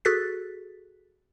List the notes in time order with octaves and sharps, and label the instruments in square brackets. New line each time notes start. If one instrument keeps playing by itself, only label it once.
[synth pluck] F#4 G#4 A4 F#6 A6 B6